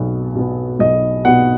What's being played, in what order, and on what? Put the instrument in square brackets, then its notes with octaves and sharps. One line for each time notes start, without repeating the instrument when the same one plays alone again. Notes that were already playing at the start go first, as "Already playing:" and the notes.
Already playing: [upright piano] B1 B2 B3
B2 B3
B1 D#5
B2 B3 F#5